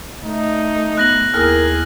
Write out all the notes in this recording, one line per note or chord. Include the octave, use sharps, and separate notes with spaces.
A3 D#4
D5
B3 F#6 A#6 F#7
D#2 A#3 E4 G#4 A#4 F6 A#6